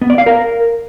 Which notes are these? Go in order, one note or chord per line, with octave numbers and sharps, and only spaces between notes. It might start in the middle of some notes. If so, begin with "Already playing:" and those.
B3
D5
F5
A#4